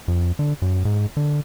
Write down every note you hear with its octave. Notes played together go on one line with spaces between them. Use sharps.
F2
D3
F#2
G#2
D3